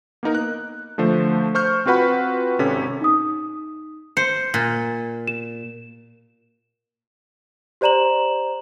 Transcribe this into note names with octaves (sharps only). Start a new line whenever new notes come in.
A#3 B3 D#4 A#4
F#6
D3 F3 A3 C5
C5 C#6 F6 G6
C4 F4 F#4 B4 F#5 B5
G#1 C3 C#4 A4 B6
D#4 D#6
C5 C#7
A#2
E7
G4 C5 D5 A#5 E7 F#7